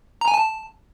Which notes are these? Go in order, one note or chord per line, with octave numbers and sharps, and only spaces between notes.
A#5
G#5
A5